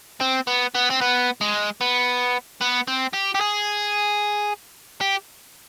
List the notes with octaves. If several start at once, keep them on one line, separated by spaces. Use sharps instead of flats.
C4
B3
B3
C4
B3
G#3
B3
B3
C4
G4
G4
G#4
G4